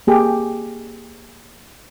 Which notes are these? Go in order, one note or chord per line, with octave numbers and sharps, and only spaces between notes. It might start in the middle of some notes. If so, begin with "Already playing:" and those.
A#3 G4 G#4